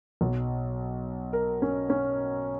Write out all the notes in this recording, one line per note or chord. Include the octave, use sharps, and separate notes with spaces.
B1 B2
A#4
C#4
C#4